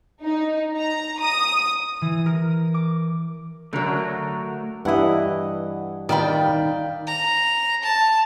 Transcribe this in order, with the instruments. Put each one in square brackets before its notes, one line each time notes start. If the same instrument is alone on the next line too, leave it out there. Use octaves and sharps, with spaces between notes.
[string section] D#4
A#5
D#6
[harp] E3
A#4
D6
[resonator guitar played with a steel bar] D3 F#3 [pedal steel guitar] A3 A#4
[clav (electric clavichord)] G2 E3 E4 [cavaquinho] D#5 F#5
[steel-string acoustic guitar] D#3 G5 [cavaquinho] D5 F5 B5
[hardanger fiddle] A#5
A5